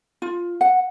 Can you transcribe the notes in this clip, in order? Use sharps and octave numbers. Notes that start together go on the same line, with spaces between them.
F4
F#5